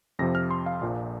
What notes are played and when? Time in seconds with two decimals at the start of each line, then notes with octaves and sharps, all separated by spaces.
0.19 F2 C3 F3 A#6
0.35 F6
0.51 C6
0.66 F5
0.81 A#1 A#2 F3